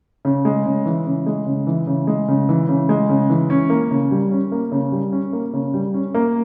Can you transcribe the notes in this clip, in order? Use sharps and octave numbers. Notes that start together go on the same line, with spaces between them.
C#3
G#3
C#3
E3
C#3
G#3
C#3
E3
C#3
G#3
C#3
E3
C#3
G#3
C#3
E3
C#4
A#3
C#3
G3
C#4
A#3
C#3
G3
C#4
A#3
C#3
G3
C#4
A#3